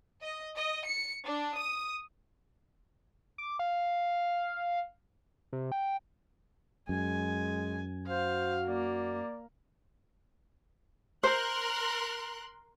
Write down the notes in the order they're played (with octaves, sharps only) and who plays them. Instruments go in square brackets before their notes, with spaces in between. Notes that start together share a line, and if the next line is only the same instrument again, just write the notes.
[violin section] D#5
D#5
C#7
D4
D#6
[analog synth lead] D6
F5
C3
G5
[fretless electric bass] F#2 [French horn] G#3 [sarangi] G#5
[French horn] F#4 [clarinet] C5 [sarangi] F5
[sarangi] A#3 [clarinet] D5
[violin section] A#4 C6 F#6 [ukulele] C5